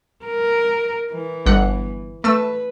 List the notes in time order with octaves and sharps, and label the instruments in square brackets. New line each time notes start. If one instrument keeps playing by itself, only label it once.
[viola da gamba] A#4
E3
[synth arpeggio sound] G1 F#5
[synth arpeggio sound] A3 E6 [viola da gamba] B4